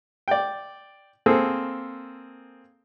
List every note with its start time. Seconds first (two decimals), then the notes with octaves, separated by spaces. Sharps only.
0.28 D5 G5
1.26 A#3 C4 G#4 A4